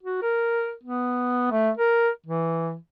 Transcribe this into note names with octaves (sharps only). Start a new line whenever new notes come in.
F#4
A#4
B3
A3
A#4
E3